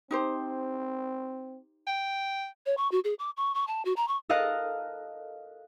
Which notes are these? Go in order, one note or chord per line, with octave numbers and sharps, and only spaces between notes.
C4 D#4 G4 C5
G5
C#5
C#6
F#4
G#4
D6
C#6
C#6
A5
F#4
A#5
C#6
A4 A#4 D#5 F5 F#6